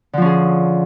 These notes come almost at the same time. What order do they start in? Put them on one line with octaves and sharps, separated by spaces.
D3 F3 C#4 G#4